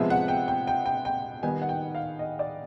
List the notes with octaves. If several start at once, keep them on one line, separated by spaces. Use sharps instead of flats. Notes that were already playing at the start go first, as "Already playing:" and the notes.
Already playing: C3 F3 G#3 B3 E5
F#5
G5
G5
G5
G5
G5
D#3 G3 B3 D#4 G#5
F#5
G5
F5
D#5
D5